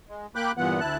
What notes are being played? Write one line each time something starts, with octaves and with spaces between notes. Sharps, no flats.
G#3
A#3 G5 B5 D6 F#6
G2 A#2 E3 B3 F#5
D2 E4 A5 F#6